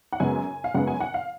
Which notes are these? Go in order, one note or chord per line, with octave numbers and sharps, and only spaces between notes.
F#5
F#2 C#3 G#3 B3 G#5
F5
F#2 C#3 G#3 B3 F#5
G#5
F#5
F5